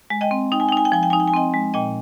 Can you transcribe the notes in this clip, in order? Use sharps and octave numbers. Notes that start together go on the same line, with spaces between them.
G#3
D#5 G5
C4
D#4 G5
G#5
G5
D#4 G#5
G5
F3 G#5
G5
D#4 G#5
G5
G#5
C4 D#5 G5
G#3
A#2 D#5 G5